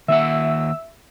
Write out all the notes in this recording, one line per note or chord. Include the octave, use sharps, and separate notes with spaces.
D#3 A#3 E5 F#5 E6